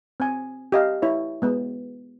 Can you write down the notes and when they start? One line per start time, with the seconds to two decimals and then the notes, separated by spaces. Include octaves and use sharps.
0.20 C4 G#5
0.72 G4 D#5 F5
1.02 E4 C#5
1.42 G#3 B3